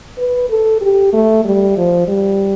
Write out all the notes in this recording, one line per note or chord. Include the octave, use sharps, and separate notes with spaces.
B4
A4
G4
A3
G3
F3
G3